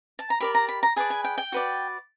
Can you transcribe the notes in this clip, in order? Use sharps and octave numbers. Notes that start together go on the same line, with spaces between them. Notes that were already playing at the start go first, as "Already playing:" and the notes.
A5
A#5
G4 A#4 D5 B5
A#5
B5
A#5
G#4 B4 D5 A5
G#5
G5
G5
F#4 B4 D5